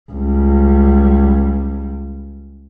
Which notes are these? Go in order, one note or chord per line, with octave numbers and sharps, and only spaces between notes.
C#2 G3